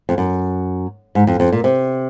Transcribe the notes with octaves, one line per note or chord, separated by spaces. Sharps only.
F2
F#2
G#2
F2
F2
A#2
C3